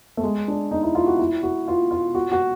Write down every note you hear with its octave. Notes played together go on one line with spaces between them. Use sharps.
A3
G#3
D4
D#4
E4
F4
F#4
E4
F#4
F4
F4
F#4
F#4